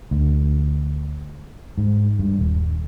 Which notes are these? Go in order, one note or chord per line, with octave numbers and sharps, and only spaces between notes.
D2
G#2
G2
D#1